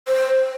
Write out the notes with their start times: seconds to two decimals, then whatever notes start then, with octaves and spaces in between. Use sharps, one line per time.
0.08 C5